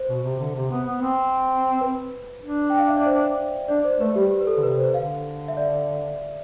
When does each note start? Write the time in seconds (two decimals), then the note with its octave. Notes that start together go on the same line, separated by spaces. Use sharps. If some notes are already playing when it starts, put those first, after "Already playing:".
Already playing: C5
0.09 B2
0.23 C3
0.40 D3
0.55 C3
0.71 B3
0.87 B3
1.02 C4
1.81 B4
2.43 D4
2.70 G5
2.79 F5
2.88 E5
2.97 D5
3.06 C5
3.68 D4 D5
3.84 C5
4.00 A3 B4
4.16 G3 G4
4.31 G4
4.41 B4
4.47 A4
4.57 D3
4.63 C3 B4
4.78 C5
4.94 D3 F5
5.48 E5
5.57 D5